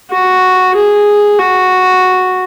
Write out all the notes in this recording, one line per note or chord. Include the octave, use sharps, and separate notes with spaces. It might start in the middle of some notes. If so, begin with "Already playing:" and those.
F#4
G#4
F#4